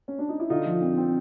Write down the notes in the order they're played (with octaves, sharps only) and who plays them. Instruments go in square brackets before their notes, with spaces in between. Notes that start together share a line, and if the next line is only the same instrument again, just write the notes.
[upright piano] C#4
D4
D#4
E4
[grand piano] D3 [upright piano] D#4 F4
[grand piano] F3
C4
C4